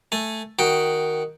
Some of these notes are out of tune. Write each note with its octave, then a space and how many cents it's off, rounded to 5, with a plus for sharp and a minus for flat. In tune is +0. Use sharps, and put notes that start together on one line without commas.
A3 +0 G#5 -5
D#3 +0 F#4 +0 G5 +0